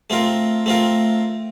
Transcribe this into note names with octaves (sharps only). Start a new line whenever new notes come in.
A3 C4 F4 A#4
A3 C4 F4 A#4